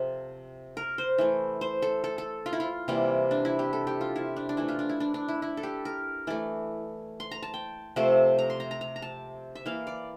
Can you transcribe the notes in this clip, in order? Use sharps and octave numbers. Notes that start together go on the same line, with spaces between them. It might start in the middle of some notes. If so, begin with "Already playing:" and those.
Already playing: C3 F3 A4
A#4
C5
E3 A3
C5
A4
A4
A4
F4
E4
F4
C3 E3 G3 A#3
D4
E4
G4
A4
G4
F4
E4
D4
D4
E3 A3 E4
F4
D4
E4
D4
D4
E4
E4
A4
G4
A#4
E3 A3 D5
C6
A#5
A5
G5
C3 F3 A3
A#5
C6
A#5
A#5
A#5
A#5
A5
E5
E3 A#3 F5
D5